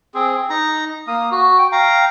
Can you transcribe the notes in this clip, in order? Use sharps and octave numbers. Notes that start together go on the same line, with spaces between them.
C4 G#4
D#4 A#5
A#3 D#6
F#4
G5
F5 G5 A#5